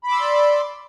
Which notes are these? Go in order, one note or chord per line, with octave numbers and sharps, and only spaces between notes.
D5 B5 C6 D6 E6